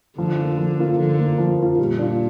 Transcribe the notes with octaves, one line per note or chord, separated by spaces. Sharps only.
D3 F3
A#3 F4
F3
A#3 F4
D3 F3
A#3 F4
F3
A#3 F4
A#2 G3
D4 F4